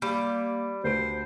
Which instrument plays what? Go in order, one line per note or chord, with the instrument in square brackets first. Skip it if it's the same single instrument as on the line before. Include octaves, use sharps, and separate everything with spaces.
[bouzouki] G3 [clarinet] A#3 [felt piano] B5 D7
[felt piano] D2 B4 D7 [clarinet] C5